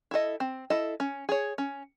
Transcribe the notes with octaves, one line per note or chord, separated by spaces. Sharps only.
E4 A4 D#5
C4
E4 A4 D#5
C#4
G#4 C#5
C#4